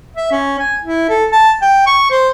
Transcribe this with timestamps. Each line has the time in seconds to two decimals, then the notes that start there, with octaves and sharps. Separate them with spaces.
0.17 E5
0.31 C#4
0.59 G#5
0.83 E4
1.09 A4
1.32 A5
1.62 G5
1.87 C#6
2.11 C5